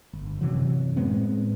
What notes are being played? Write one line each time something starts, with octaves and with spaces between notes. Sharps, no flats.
G1
F#2 C3 E3 F#3
A2 G#3 B3 C4